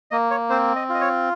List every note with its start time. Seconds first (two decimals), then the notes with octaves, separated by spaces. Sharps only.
0.11 A#3 D#5
0.31 C#5
0.50 C4 C5
0.76 D#5
0.89 F4
0.95 D#5
1.01 C#5